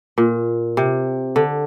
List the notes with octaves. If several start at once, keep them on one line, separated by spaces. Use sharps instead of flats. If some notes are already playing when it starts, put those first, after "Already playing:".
A#2
C3
D3